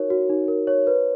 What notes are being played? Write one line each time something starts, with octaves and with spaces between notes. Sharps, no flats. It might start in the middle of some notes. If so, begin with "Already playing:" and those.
Already playing: D#4 F#4 A#4 C#5
F#4
D#4
A#4
C#5
B4